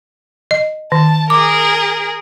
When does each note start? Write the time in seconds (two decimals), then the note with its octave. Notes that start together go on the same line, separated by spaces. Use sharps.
0.51 D#5
0.92 D#3 A5
1.30 G#4 A#4 D6